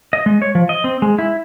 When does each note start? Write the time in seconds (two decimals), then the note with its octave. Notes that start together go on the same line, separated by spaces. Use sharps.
0.13 D#5
0.26 G#3
0.42 C#5
0.55 F3
0.69 D#5
0.84 C4
1.02 G#3
1.19 E4